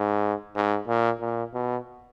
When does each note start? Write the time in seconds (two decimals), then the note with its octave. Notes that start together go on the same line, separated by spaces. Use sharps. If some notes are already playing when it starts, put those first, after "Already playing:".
Already playing: G#2
0.55 G#2
0.87 A#2
1.21 A#2
1.54 B2